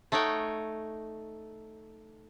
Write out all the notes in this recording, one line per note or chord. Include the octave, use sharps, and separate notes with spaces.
A3 D#4 C#5 F#5 G5